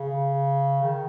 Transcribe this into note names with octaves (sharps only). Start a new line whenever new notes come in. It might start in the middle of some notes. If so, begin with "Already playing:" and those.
Already playing: C#3
D#3